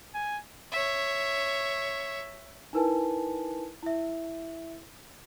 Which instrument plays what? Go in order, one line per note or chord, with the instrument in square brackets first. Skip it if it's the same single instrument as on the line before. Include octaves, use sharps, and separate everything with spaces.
[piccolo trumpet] G#5
[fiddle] C#5 E5
[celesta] D#4 E4 A#4 B4 G#5 A5
E4 E5